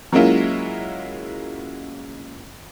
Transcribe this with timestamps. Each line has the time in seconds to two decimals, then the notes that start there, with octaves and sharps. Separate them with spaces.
0.13 F#3 G#3 A#3 C#4 E4 F4